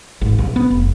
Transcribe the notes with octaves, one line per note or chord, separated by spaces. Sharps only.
G#1
A#1
B3
F1